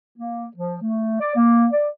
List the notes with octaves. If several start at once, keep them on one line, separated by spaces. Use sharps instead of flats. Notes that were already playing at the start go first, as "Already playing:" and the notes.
A#3
F3
A3
D5
A#3
D5